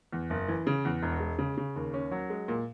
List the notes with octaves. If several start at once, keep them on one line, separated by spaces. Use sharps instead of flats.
E2
F#1
E3
C#3
E2
E1
G#3
C#3
C#3
D#2
C#4
F#3
G#3
A#2